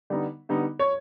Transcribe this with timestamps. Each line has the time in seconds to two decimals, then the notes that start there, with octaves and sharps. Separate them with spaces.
0.10 D3 G3 B3 D#4
0.49 D3 G3 B3 D#4
0.79 C#5